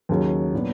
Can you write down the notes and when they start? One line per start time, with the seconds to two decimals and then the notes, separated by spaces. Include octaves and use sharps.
0.09 D#2 C#3 F#3
0.53 A#2 F#3 B3 D4